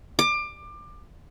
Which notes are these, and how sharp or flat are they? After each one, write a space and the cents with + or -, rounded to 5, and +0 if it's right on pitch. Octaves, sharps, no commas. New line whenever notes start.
D6 +25